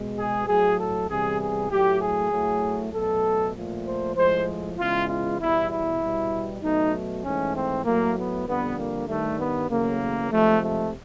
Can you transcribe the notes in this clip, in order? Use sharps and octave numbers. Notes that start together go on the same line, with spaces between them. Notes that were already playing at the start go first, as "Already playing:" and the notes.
Already playing: B2 G#3
G#4
A2 F#3 A3 G#4
A4
E2 C3 E3 G3 G#4
G#4
A2 F#3 A3 G4
G#4
A2 F#3 A3
B2 F#3 A3 A4
A#2 F3 A3
C5
A2 F3 G#3 C5
E2 C#3 E3 G#3 F4
F4
E2 B2 G3 E4
E4
B2 G3
B2 F#3 A3 D#4
G#2 E3 A3 C#4
C4
A2 F#3 A3 A#3
B3
F2 D3 G3 B3
A#3
G2 D#3 G3 A3
B3
E2 C#3 F#3 A3 A#3
C3 F3 G#3 A3
A3